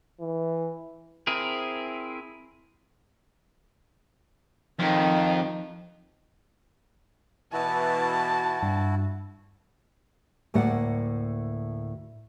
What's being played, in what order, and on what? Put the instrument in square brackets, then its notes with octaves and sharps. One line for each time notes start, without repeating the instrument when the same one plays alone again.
[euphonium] E3
[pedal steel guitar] C4 E4 G#4 A#4
[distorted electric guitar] F2 [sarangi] D#3
[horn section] B2 E3 [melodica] E4 F#4 [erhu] A5
[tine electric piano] G2
[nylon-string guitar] D2 A2 A#3 D5 F#5